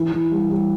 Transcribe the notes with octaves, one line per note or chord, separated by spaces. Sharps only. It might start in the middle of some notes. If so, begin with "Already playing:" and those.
Already playing: E3
E3
G3
G3